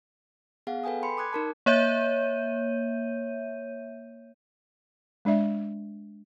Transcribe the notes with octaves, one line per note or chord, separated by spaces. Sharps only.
B3 G#4 F5 F#5
A4 B4 G5 G#5 D#6
B5 C6 C#7
D6 D#6 F#6 G#6
D#4 A#4 A5
A#3 C#5 E5 G6 D#7
G#3 D4 D5 E5